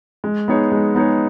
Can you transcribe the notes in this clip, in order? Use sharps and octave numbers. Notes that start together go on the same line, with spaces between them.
G#3
B3 D#4 G#4 C#5
G#3
B3 D#4 G#4 C#5